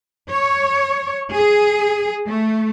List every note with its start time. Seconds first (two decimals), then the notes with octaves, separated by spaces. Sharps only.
0.30 C#5
1.33 G#4
2.26 A3